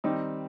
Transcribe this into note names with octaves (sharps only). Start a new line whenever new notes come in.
D#3 G3 C4 D#4